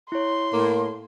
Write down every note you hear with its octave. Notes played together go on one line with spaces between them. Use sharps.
E4 C#5 C6
A2 A#3